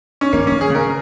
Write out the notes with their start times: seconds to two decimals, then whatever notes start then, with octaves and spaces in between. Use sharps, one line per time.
0.21 C#4
0.33 D#3 A#3
0.47 D#3 C#4
0.61 G#4
0.70 C#3
0.75 A#4